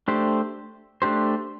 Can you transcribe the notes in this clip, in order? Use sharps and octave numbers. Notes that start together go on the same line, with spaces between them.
A3 D4 G4 C5
A3 D4 G4 C5